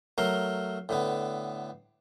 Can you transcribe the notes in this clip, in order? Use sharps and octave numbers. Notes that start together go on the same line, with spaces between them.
F#3 A3 A#4 C6
A2 D3 B3